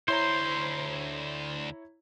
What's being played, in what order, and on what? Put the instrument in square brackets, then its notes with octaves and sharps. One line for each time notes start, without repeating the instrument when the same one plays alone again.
[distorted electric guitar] D2 C6 [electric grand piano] E4 C#5 A#5 [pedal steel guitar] C5